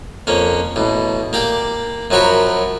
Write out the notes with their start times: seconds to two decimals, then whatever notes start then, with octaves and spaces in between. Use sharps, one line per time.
0.27 F2 A#3 C#4
0.76 A1 B2
1.33 A#3 G4 D5
2.11 F#2 F3 F#3 F#4 A#4 B5